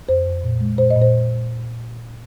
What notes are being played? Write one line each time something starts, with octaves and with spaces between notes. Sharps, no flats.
F2 C5
F2
A#2
G#3
A#2 C5
D#5
A#2
C5